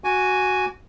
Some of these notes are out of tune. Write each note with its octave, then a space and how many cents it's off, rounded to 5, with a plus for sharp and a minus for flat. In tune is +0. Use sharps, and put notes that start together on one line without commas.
F#4 +0 G#5 +0 D6 -35